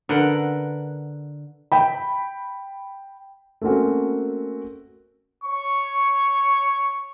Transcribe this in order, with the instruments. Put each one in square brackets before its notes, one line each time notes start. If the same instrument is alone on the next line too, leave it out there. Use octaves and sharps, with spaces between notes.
[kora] D3 A#4 B4 F#5
[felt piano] G5 B5
[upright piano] A3 A#3 C4 C#4 F#4
[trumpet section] C#5 C#6